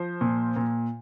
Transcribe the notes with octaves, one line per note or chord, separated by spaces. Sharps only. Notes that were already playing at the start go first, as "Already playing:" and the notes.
Already playing: F3 C5
A#2
A#2